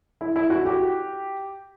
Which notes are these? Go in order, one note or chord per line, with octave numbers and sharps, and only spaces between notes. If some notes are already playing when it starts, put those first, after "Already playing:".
E4
E4
F#4
G4